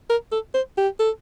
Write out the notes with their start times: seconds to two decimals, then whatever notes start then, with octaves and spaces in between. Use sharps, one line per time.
0.10 A#4
0.32 A4
0.54 C5
0.78 G4
0.99 A4